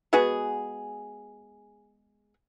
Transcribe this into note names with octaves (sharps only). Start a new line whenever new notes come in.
G#3 B3 F#4 G#4